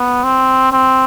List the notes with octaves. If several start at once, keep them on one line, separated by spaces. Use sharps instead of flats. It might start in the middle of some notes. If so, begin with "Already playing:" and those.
Already playing: B3
C4
C4